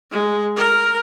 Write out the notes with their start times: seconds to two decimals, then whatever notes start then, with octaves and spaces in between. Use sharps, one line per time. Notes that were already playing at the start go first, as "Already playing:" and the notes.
0.11 G#3
0.57 A#4